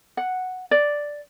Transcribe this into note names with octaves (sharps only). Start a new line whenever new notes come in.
F#5
D5